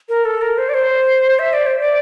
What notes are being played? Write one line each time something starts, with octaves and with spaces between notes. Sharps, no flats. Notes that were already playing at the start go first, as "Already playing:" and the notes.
A#4
A4
A#4
C5
D5
C5
E5
D5
C5
D5